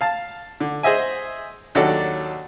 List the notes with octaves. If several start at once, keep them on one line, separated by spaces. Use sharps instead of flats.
F5 A5
D3
G#4 C5 D#5 E5 G#5
D#2 F#3 D4 A4 D5 F#5